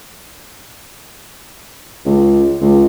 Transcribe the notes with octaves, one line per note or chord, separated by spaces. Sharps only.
C#2
C#2